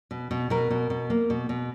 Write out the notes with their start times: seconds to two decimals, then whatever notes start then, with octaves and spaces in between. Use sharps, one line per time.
0.11 B2
0.31 B2
0.50 B2 A#4
0.70 B2
0.90 B2
1.10 A#3
1.30 B2
1.49 B2